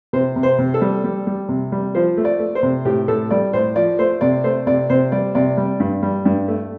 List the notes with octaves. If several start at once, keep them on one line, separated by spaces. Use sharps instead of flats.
C3 C5
C3
C5
C3
A4
G3
G3
G3
C3
G3
F3 C5
A3
D5
A3
C5
C3
A2 G4
A2 A4
G3 D5
A2 C5
F3 D5
A3 C5
C3 D5
A3 C5
C3 D5
C3 C5
G3 D5
C3 D5
G3
G2
G3
G2
A3